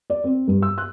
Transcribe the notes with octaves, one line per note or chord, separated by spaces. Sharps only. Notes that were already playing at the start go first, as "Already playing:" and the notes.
D5
C4
G2
E6
F#6